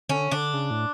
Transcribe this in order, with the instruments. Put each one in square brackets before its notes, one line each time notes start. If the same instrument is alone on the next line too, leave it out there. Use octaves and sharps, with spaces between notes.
[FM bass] D3 [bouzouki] C#4
[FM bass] D3 [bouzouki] D4
[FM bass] C#3
A2